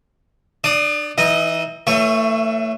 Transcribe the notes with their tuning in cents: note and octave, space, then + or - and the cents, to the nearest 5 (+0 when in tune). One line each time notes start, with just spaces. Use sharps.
D4 +40 D5 +0 D#6 +0
E3 +0 D#4 +35 D#5 -15
E3 +0 A3 +35 C#5 +0